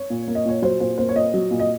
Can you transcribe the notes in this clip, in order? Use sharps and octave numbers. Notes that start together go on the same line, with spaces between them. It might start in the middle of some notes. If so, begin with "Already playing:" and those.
Already playing: C#5
A#2
A#3
D#5
A#2 C#5
F#3 C5
A#2 C5
A#3 C5
C#5
A#2 D#5
F#3
A#2
D#5